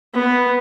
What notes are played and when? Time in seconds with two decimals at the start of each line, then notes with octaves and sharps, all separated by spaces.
0.15 B3